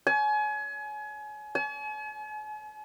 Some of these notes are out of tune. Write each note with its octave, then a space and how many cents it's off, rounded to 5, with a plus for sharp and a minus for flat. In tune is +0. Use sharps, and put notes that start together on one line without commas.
G#5 +30
G#5 +45